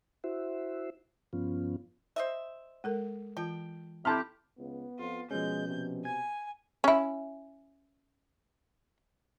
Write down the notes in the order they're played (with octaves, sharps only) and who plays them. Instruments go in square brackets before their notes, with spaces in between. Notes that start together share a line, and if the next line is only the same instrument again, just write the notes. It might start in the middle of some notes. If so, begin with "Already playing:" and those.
[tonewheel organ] E4 F#4 C5 E5
G2 F3 B3 C#4 F4
[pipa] C5 D#5 E5
[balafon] G#3 A4 A#4
[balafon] E3 F4 A5 [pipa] G5
[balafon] C4 A4 [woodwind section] E4 G4 [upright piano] A5 C6 F6
[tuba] C#2 [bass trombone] B3
[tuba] F2 [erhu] F4
[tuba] B2 [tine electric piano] F3 C#4 [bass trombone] G#3 [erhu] G6
[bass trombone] C3
[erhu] G#5 [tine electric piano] G#6
[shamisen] C#4 E4